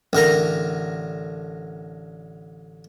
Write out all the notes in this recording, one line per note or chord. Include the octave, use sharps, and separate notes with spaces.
A1 D3 A#4 A#5